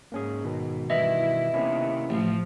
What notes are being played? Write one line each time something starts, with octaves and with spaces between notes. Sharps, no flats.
G#2 A#3 C#4 G#4
B2 D#3
G2 E3 E4 D#5 E5
C3 D#3 A#3 B3 C#4 E4
A1 F3